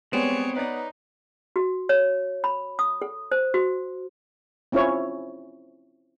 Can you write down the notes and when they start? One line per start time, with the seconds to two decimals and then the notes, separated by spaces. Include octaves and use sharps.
0.13 G3 G#3 B3 C4 C#5 D5
0.56 D#4 B4 C#5 D5
1.56 F#4
1.89 C#5
2.44 B5
2.79 D#6
3.02 A4
3.32 C5
3.54 F#4
4.72 C4 C#4 E4 F4 C#5